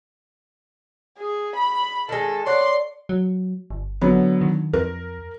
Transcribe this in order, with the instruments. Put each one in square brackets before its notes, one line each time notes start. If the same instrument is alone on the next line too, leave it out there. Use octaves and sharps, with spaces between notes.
[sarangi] G#4
B5
[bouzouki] D#3 G#3 [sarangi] A4
[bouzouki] C#5 D5 F#5 [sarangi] C6
[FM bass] F#3
G1
[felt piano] D3 F#3 B3
[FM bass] D#3
[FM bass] F2 [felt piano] A#4